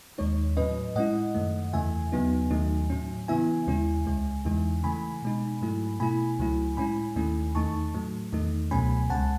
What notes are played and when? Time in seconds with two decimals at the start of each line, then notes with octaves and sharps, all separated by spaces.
0.18 D#2 D#3 G#3 D#4 C#5
0.57 A2 F#3 C#4 B4 D#5
0.95 A2 G#3 C#4 E4 D#5 F#5
1.35 F#2 D#3 A3
1.73 E2 C#3 E3 A3 E5 G#5
2.12 D#2 C#3 F#3 B3 D#4
2.51 D#2 D#3 F#3 A3 D#4
2.90 A2 F#3 C#4
3.28 C#3 E3 B3 E4 E5 G#5
3.67 D#2 C#3 G#3 C#4 E4
4.06 C#2 C#3 G#3
4.45 E2 C#3 E3 G#3 D#4
4.83 C#3 E3 A3 G#5 B5
5.23 B2 G#3 D#4
5.61 G#2 F#3 A3 E4
6.00 B2 A3 E4 G#5 B5
6.39 C#2 C#3 F#3 A3 E4
6.77 A2 G#3 C#4 E4 G#5 B5
7.16 D#2 D#3 A3 C#4 E4
7.55 E2 D#3 A3 D#4 A5 C#6
7.94 A2 F#3 A3
8.32 E2 D#3 A3 D#4
8.71 C#2 B2 F#3 A3 C#4 G#5 B5
9.10 C#2 C#3 G#3 F#5 A5